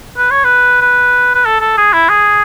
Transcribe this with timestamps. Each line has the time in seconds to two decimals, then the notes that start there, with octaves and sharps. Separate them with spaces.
0.17 B4
0.31 C#5
0.44 B4
0.81 B4
1.35 B4
1.45 A4
1.61 A4
1.78 G#4
1.93 E4
2.09 G#4